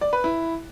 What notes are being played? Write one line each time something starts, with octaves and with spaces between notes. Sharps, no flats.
D5
B4
E4